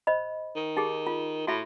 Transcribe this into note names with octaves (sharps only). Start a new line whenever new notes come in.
C5 D#5 B5
D#3
D#4 G4 G#4
F4
A2 F#4 E5 B5